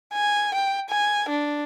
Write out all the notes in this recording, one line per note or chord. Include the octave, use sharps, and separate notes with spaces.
G#5
G5
G#5
D4